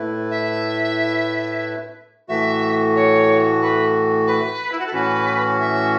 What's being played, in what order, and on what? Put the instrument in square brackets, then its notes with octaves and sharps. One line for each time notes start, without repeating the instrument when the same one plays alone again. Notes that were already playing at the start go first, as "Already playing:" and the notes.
Already playing: [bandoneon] A2 A3 E4 B4
[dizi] E5
[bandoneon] A2 E3 A3 F#4 [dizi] E5
[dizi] C#5
B4
B4
E4
F#4
A4
[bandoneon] A2 E3 C#4 F#4 [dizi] B4
[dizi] E5